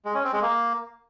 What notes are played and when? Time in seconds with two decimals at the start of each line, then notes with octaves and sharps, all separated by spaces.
0.05 G#3
0.15 C#4
0.24 C4
0.33 G#3
0.42 A#3